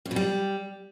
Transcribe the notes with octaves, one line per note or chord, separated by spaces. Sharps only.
F2
B2
G3